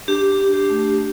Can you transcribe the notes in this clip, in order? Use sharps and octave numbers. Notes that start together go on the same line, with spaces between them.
D4 G4
D4
G4
A3